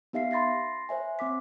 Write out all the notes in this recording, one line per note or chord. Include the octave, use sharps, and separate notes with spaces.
B3 D#4 G4 E5 F5 C7
B5 C6 A6 A#6 C7
C5 C#5 E5 G#5
C4 C5 D6 B6